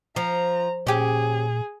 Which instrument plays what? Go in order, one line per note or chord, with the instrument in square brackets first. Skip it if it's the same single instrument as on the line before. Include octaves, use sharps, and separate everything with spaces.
[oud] F3 [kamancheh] A#5
[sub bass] A#2 [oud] C#4 G4 [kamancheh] G#4